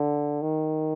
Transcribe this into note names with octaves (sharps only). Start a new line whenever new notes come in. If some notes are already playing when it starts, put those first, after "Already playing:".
Already playing: D3
D#3